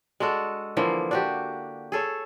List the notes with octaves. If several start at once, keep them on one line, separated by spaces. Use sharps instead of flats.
G#3 D4 F#4 A4
D3 E3 F3 A#3
D4 F#4 G4
G#4 A4 C#5